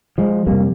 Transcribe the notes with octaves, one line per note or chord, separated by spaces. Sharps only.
F3 G#3
F2 C3 G3 A#3